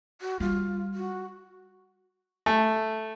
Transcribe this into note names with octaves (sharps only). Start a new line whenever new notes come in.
F#4
G3 F4
F#4
A3